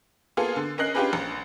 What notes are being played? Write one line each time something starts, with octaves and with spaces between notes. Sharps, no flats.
A#3 B3 F4 G#4 A4
D3
C#4 A#4 D#5 F#6 C7
C#4 D4 F4 G4 G#4 B4
A#1